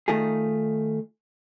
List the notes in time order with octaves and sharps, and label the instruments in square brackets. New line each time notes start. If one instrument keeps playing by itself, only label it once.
[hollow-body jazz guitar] D#3 A3 D#4 F4 G#4